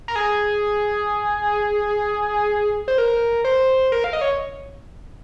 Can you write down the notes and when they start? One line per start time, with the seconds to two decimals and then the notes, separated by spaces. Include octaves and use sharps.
0.08 A#4
0.16 G#4
2.88 C5
2.98 A#4
3.45 C5
3.92 A#4
4.04 F5
4.13 D#5
4.21 C#5